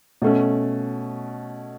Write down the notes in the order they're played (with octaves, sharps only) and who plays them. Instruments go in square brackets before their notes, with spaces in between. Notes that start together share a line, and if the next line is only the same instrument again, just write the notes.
[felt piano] B2 A3 C#4